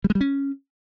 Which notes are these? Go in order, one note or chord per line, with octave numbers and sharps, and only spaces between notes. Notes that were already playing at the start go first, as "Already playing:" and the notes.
G3
G#3
G3
C#4